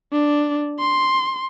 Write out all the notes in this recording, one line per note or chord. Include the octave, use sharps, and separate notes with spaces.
D4
C6